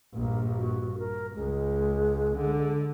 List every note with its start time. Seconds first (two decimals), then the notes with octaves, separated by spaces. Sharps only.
0.14 A#1 G2 A#3
0.57 F#4
0.98 A#4
1.35 C#2 G#3
2.37 D3